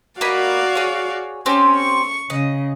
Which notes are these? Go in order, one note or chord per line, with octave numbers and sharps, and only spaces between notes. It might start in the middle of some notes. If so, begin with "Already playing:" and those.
A#3 F#4 D5 D#5 F5 B5
G#4 C#5
C4 C#4 G4
C#6
C#3 D#5